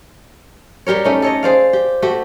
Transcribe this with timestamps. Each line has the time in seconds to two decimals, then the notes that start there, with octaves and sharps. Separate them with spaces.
0.87 G3 G4 A#4 C#5
1.04 A3 C#4 D#4
1.22 A4 C#5 D#5
1.43 G#4 C5 D5 F5
1.73 G4
2.02 A3 F#4 G4